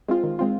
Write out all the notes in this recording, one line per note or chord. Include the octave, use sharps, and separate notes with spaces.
G#3 C4 F4
D#3
G#3 C4 F4